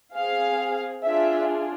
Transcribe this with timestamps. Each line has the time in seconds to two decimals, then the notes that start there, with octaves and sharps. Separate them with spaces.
0.16 C4 G#4 F5
1.03 D4 F4 G#4 E5